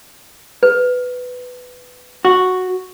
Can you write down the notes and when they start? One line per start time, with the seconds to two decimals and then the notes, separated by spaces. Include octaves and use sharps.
0.63 B4
2.25 F#4